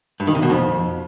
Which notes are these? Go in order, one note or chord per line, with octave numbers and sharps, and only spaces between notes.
G2
D#3
C3
B2
F2